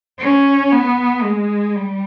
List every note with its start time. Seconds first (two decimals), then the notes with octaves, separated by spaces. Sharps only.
0.19 C#4
0.72 B3
1.23 G#3
1.75 G3